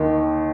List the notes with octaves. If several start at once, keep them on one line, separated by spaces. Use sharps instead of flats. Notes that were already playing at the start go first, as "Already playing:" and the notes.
Already playing: D#2 D#3